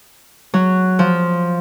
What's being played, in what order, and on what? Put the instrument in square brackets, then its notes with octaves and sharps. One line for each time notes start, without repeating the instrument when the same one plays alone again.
[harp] F#3
F3